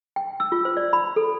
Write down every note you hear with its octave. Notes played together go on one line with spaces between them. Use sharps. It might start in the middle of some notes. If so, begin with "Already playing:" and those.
G5
E6
F4
C5
D5
B5
A4